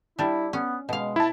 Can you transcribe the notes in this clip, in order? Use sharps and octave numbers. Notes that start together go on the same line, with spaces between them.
G3 D4 E4
B3 C#4
B2 G#3 F5
E4 A5